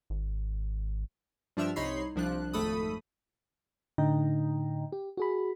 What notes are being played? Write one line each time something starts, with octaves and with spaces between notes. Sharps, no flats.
G#1
G2 F3 D4 E5 E6 F6
C2 D#4 C#5 B5 C6 C7
C2 F3 D4 F#6
G#1 F2 A3 A4 B5 D#6
A2 D3 D#4 D#5 G5 A#5
G4
F#4 G#4 B5